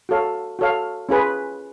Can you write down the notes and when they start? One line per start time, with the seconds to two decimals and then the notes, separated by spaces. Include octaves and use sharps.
0.09 F#4 A4 C#5 F5
0.59 F#4 A4 C#5 F5
1.09 C#4 F4 G#4 B4